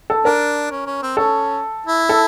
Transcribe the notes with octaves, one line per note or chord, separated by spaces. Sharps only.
A4
D4 A#4
C#4
C#4
C4
C#4 A4
E4
A4